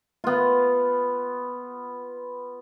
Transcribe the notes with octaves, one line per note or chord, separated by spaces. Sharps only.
B3 F4